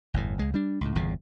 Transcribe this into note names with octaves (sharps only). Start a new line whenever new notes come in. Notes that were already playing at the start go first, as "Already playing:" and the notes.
G1 E2 A2
C#2 G#3
G3 D4
C#2 A2
G1 E2 A#2 C#3